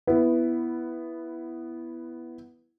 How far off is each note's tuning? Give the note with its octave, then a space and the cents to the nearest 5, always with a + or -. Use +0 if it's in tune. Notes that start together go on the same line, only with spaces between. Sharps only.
B3 +0 E4 +10